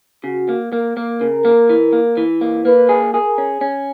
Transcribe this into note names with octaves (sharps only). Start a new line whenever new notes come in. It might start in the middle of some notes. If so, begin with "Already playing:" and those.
C#3 F#4
A#3
A#3 A#4
A#3
C#3 A#4
A#3
E3
A#3
E3
A#3
A#3 B4
G#4
G#4 A#4
C#4
C#4